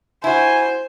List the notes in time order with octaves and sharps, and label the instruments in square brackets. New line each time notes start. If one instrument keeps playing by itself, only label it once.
[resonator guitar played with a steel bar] E4 F#4 [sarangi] C5 [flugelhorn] G#5